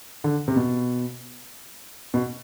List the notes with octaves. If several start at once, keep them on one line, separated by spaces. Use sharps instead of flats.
D3
C3
B2
B2